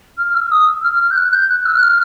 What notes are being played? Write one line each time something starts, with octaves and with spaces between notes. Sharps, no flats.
F6
E6
D#6
E6
F6
F6
G6
F#6
G6
F#6
E6
F#6
F6